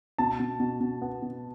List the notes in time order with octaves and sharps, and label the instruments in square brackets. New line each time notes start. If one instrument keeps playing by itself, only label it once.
[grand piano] B2 A5
B2
B2
B2
B3
B2